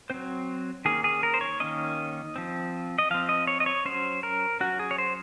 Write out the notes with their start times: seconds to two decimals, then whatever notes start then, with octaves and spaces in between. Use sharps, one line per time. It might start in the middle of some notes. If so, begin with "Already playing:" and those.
0.10 F#3 C4 C5
0.85 D#3 A#3 C#4 G#4
1.04 G#4
1.23 A#4
1.34 C5
1.41 C#5
1.60 D#3 A#3 C#4 D#5
2.36 F3 C4
2.99 D#5
3.10 F3 C4 F5
3.29 D#5
3.47 C#5
3.60 D#5
3.66 C#5
3.85 F#3 C#4 C5
4.23 A#4
4.60 F#3 C#4 F#4
4.79 G#4
4.91 C#5
4.98 C5